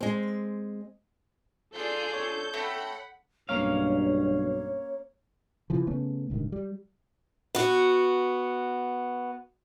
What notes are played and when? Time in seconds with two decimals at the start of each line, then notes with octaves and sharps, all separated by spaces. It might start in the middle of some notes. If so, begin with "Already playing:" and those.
0.01 G#3 C4
1.73 F4 G#4 A4 D5 G6
2.14 C#5
2.54 A3 C4 F#5 B5
3.49 B1 G2 A#3 C#4 C#5 F5
5.70 C#3 E3 F3
5.87 C#3 A3 B3 C#4
6.30 D1 C#2 G2 D#3
6.52 G3
7.55 B3 F#4